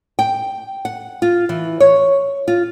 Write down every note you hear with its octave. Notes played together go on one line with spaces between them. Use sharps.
G5
F#5
F4
E3
C#5
F4